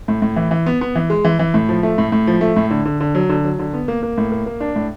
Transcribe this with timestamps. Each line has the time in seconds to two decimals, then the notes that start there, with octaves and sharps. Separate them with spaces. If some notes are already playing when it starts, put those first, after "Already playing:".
0.08 A2
0.22 A2
0.36 E3
0.51 E3
0.66 B3
0.81 B3
0.96 E3
1.10 G#3
1.25 E3
1.39 E3
1.54 A2
1.69 F3
1.83 A3
1.98 A2
2.12 A2
2.27 F3
2.41 A3
2.56 A2
2.71 D3
2.85 D3
3.00 D3
3.15 F#3
3.29 D3
3.44 F#3
3.59 D3
3.73 B3
3.88 A#3
4.03 A#3
4.18 A2
4.32 A#3
4.46 A#3
4.60 D4
4.76 A2